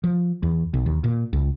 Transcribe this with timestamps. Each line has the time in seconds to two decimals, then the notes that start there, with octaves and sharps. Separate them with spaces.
0.04 F3
0.43 E2
0.74 B1
0.86 D#2
1.04 A#2
1.33 C#2